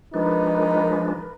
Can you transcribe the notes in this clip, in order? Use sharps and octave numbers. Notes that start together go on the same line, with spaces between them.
F3 G#3 D4 D#4 A#4 B4